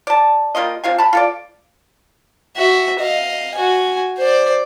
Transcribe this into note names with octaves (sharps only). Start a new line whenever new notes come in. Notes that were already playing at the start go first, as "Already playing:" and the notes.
D5 A5
G3 A#3 F4 D#5
C3 F4 F5 G#5
A5 B5
F4 A4 D5
F#4 E5
D#5 F5
F#4 G#5
C5 D5